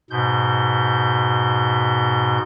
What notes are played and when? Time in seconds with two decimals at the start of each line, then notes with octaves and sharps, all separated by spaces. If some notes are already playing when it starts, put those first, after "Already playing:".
0.10 G#2 B2 G6